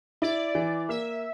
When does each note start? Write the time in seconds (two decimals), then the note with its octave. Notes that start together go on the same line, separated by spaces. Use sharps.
0.22 E4 D5
0.55 E3
0.89 A#3 E5